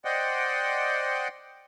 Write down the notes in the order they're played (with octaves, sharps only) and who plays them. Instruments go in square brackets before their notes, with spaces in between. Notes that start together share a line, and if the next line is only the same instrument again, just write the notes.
[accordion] C5 D5 D#5 F#5 G5